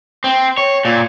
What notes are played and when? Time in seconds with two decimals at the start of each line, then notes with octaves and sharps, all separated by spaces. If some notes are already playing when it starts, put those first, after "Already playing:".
0.24 C4
0.58 C#5
0.85 A#2